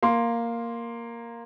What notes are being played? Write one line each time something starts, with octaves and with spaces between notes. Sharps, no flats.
A#3 C6